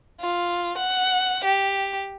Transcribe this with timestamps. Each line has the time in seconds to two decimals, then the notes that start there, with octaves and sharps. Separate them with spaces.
0.21 F4
0.78 F#5
1.45 G4